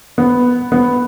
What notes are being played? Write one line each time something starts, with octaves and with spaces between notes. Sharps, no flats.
B3
B3